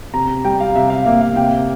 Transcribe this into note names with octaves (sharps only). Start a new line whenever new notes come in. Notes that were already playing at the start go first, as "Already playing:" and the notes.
C3 A#5
G3 G5
F5
C3 E5
F5
A#3 E5
F5
C3 G5